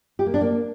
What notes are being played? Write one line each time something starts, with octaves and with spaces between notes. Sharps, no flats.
G4
A#3
D4
A#3